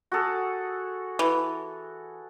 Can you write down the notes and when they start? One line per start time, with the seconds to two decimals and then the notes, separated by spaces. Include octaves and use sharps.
0.12 F#4 G#4 A4
1.19 E3